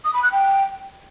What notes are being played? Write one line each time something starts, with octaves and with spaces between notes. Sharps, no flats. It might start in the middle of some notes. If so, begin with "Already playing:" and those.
D#6
B5
F#6
G5